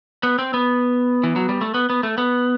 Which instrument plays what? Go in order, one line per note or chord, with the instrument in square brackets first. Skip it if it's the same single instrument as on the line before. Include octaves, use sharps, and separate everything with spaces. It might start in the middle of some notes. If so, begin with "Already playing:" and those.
[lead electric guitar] B3
C4
B3
E3
F#3
G3
A3
B3
B3
A3
B3